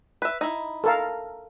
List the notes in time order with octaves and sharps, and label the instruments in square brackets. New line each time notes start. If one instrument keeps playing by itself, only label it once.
[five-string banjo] B4 E5
D#4 E4
[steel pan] A4 A#4 F5